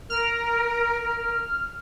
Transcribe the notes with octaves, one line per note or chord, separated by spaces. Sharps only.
A#4 F6